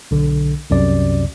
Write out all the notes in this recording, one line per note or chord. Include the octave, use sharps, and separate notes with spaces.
B1 D3
C2 F#2 C3 D5